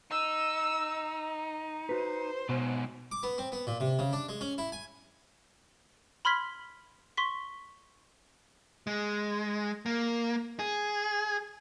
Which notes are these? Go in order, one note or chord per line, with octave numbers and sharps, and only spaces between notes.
D#4 E6
F#4 B4 C5
G#2 B2 F#3
D6
B3
C4
B3
A#2
C3
C#3
D4
G#3
C#4
E4
G#5
B5 C6 F6 G#6 B6
C6 C#6 B6
G#3
A#3
G#4